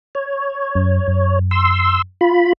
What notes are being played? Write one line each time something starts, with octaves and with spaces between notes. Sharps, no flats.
C#5
F#2
F#2
C6 E6
F4 B5